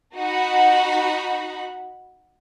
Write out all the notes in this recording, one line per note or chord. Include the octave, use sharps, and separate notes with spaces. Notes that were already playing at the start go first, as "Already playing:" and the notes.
D#4 F#4 F#5 B5